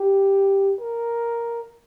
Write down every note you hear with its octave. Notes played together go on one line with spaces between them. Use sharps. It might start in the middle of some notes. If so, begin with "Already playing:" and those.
Already playing: G4
A#4